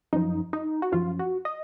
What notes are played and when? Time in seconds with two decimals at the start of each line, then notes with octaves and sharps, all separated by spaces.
0.13 F#2 F3 D#4
0.53 D#4
0.82 F#4
0.92 F#2 F3 F4
1.19 F#4
1.45 D#5